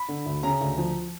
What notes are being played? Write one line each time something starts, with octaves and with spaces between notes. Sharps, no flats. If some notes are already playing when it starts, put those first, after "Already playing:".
Already playing: B5
D3
D2
C#3 A#5
D2
F3